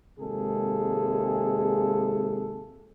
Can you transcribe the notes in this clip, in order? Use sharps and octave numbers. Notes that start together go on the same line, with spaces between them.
G#1 C3 G#3 A#3 G#4 A4